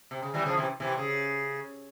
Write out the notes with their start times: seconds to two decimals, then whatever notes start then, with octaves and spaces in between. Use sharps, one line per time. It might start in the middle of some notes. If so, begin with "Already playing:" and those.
0.11 C3
0.23 C#3
0.34 E3 G3
0.46 C#3 F3
0.57 C3 E3
0.80 C3 E3
0.98 C#3